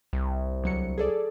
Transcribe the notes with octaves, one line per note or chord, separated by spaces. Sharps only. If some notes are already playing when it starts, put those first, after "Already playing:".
C2
D2 F#3 C#7
G#4 A4 D5